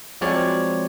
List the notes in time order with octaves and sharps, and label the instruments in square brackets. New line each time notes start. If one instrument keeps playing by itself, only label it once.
[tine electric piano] F3 F#3 G#3 C4 C#5 D5